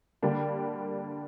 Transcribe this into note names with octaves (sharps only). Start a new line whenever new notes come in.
D3 G3 A#3 D4